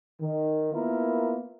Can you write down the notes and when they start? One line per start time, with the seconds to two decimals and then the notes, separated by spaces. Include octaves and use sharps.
0.21 D#3
0.73 A#3 B3 E4 F4 A#4